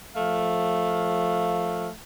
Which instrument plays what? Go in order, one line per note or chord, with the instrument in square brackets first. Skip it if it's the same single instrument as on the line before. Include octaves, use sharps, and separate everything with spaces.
[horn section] F3 A3 F5